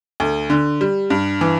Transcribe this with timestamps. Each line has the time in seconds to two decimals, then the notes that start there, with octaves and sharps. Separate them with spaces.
0.20 D2
0.50 D3
0.81 G3
1.10 G2
1.41 E3